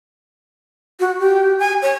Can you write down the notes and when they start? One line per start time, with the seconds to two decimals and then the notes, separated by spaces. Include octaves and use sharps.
1.00 F#4
1.20 G4
1.59 G#5
1.82 C#5